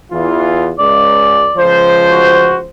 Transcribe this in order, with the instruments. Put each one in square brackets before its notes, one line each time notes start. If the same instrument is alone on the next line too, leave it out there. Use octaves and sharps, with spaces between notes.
[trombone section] E2 E3 F4
[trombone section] C#2 [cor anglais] D5
[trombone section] C#2 F3 C5
[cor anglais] F#4